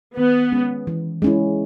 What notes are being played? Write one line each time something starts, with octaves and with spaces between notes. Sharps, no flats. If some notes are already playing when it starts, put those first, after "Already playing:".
D#3 B3
G#3 C#4
E3
G#3 C#4 E4